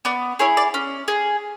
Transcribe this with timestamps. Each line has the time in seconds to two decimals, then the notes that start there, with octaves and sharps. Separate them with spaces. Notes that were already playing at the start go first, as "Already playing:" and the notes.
0.05 B3 D5
0.39 E4 G#4 C#5
0.57 D5
0.74 C#4
1.08 G#4